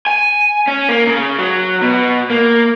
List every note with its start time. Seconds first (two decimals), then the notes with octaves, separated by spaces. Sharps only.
0.07 G#5
0.68 C#4
0.89 A#3
1.07 C#3
1.39 F#3
1.81 B2
2.30 A#3